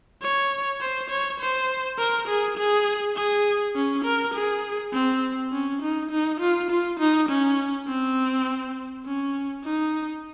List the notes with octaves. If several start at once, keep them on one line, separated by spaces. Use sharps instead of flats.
C#5
C5
C#5
C5
A#4
G#4
G#4
G#4
C#4
A#4
G#4
C4
C#4
D#4
D#4
F4
F4
D#4
C#4
C4
C#4
D#4